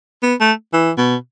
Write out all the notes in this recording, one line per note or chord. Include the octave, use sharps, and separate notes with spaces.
B3
A3
E3
B2